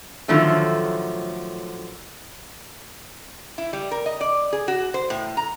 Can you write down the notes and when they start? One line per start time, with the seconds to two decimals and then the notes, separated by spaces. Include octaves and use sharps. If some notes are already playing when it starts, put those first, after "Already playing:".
0.28 A2 D3 D#3 F3 F#3 A3
3.58 E4
3.73 G3
3.91 A#4
4.06 D#5
4.21 D5
4.53 G#4
4.68 F#4
4.94 C5
5.10 A2
5.37 A#5